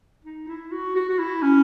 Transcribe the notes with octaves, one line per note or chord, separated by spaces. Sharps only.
D#4
E4
F#4
F#4
F#4
E4
C#4